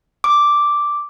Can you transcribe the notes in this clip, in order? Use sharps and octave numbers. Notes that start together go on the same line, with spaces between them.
D6